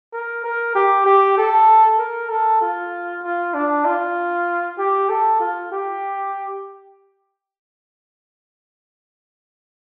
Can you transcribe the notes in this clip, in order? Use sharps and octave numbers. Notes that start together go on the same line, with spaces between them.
A#4
A#4
G4
G4
A4
A#4
A4
F4
F4
D4
F4
G4
A4
F4
G4